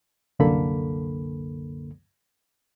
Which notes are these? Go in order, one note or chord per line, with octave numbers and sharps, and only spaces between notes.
C2 F#2 D3 A#3 A4 B5